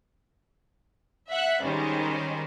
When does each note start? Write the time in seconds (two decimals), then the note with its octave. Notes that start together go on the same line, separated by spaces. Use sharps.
1.31 E5 F#5 F#6
1.62 D#3 G3 G#3 C#4 C5